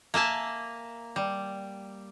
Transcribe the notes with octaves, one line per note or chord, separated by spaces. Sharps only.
A#3 E5 G#5 A5
G3